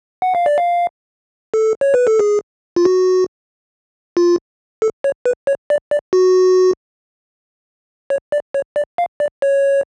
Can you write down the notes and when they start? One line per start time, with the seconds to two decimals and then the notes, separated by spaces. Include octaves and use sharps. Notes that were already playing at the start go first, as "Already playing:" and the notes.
0.22 F#5
0.35 F5
0.46 D5
0.58 F5
1.54 A4
1.81 C#5
1.94 B4
2.07 A4
2.19 G#4
2.76 F4
2.85 F#4
4.17 F4
4.82 A4
5.04 C#5
5.26 B4
5.47 C#5
5.70 D5
5.91 D5
6.13 F#4
8.10 C#5
8.32 D5
8.54 C#5
8.76 D5
8.98 F5
9.20 D5
9.42 C#5